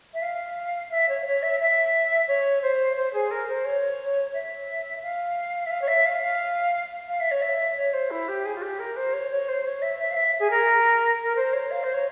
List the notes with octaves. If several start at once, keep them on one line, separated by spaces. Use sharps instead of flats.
E5
F5
E5
C#5
C#5
E5
E5
C#5
C5
C5
G#4
A#4
C5
C#5
E5
F5
E5
F5
C#5
E5
F5
F5
F5
E5
C#5
E5
C#5
C5
E4
G4
G#4
F4
G4
A#4
C5
C#5
C#5
C5
C#5
E5
E5
F5
E5
G#4
A#4
A#4
C5
C#5
F5
C5
C#5